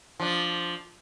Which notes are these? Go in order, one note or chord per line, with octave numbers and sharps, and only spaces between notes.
F3 D4